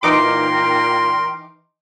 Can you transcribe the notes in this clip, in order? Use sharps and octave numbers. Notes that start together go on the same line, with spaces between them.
A#2 E3 D#4 A#4 G5 C6 D6 F6